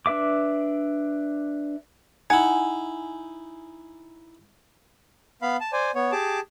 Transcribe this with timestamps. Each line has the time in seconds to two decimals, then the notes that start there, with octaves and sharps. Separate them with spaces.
0.06 D4 B4 E5 D6
2.30 D#4 E4 F#5 G#5
5.42 B3 F5 B5
5.61 A5
5.72 C5 D5 G#5
5.95 B3 C#5
6.12 G4 G#4 A5 D6